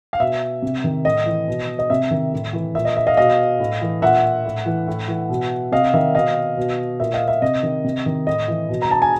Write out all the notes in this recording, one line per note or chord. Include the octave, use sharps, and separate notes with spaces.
F5
B2 E5
C3
D#3
A2 D#5
E3
B2
D#5
C3 E5
D#3
A2
E3
A#2 E5
D#5
E5
D#5 F5
B2 D#5 F5
A2
E3
A#2 E5 F#5
A2
E3
A2
E3
B2
C3 D#5 F5
D#3 E5
B2 D#5 F5
B2
A#2 E5
D#5 F5
E5
C3 D#5
D#3
C3
D#3
A2 D#5
E3
B2
A#5
A5
G#5